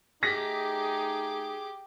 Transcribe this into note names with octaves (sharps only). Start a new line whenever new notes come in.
A3 D#4 G4 G#4 D6 A#6 B6